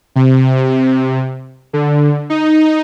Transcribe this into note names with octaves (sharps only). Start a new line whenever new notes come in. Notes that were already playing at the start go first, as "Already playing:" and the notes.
C3
D3
D#4